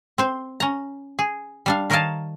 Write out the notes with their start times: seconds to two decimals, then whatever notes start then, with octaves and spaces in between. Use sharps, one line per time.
0.18 C4 C5
0.60 C#4 A#5
1.19 G#4
1.66 G3 D4 F5
1.90 D#3 A#4 C#5 D#5 F5 A5